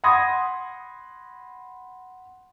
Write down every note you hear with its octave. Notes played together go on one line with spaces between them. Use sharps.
F#5 B5 C6 D#6 G#6 A#6